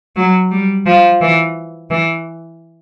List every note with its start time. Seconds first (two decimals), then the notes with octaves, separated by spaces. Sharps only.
0.16 F#3
0.51 G3
0.86 F3
1.21 E3
1.90 E3